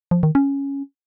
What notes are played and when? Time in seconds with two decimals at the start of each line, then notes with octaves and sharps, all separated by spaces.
0.11 F3
0.23 D#3
0.35 C#4